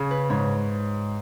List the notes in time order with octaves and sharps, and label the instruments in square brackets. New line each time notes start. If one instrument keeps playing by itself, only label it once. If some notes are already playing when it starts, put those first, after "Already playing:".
Already playing: [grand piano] C#3 [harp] G#4 C#5
[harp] B4
[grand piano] G#2 [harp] C#5